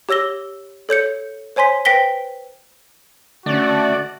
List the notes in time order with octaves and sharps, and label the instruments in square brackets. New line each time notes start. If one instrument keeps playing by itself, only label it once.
[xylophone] G4 C#5 E6 A#6 G7
A4 C#5 G6 C#7
C5 C#5 G#5 C6 B6
B4 C5 G5 A#6 B6 G7
[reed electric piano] D3 C#4 [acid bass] A3 [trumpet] F#4 [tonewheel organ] D5